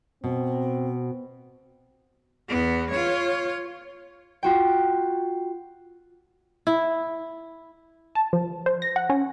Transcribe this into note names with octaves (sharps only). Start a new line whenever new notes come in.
B2 C4
E2 B3
F4 C#5
F4 F#4 G5
E4
A5
F3
C5
A#6
F#5
C#4